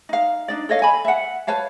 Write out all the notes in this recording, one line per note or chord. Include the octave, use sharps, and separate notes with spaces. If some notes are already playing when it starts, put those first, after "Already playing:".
D#4 F5
D4 D#4 D5
A4 C#5 D#5 F5
G#5 B5
E5 F#5
B4 C#5 F5 A5